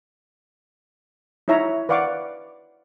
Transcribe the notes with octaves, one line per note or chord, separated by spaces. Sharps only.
D#4 E4 C#5 E5 A#5
B4 D5 F5 F#5 C#6 D6